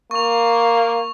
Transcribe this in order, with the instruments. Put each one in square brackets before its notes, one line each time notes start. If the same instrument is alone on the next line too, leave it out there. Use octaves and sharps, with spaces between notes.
[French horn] A#3 [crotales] C#6 F7